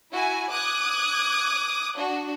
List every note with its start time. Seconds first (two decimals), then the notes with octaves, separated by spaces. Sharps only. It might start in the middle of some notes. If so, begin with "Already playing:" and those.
0.10 E4 F#4 G#5
0.50 D6 D#6 F#6 G#6
1.96 D4 F#4